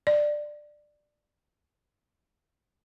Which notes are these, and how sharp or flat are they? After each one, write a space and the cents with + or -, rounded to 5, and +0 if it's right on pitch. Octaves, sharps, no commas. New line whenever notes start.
D5 +15